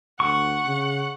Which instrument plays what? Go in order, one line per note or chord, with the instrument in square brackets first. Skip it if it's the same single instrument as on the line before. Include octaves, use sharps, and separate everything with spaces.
[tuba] D2 [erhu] F#5 [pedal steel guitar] C#6
[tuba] C#3